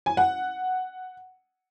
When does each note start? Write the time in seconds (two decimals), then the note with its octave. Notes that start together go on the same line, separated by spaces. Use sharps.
0.06 G#5
0.17 F#5